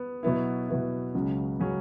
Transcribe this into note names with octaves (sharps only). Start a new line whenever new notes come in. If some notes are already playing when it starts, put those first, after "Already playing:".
Already playing: B3
B2 F#3 B3 E4
B2 F#3 B3 E4
C#2 C#3 F#3 C#4
C#3 F#3 C#4